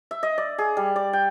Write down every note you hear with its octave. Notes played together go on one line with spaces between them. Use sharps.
E5
D#5
D5
G#4
G3
D5
G5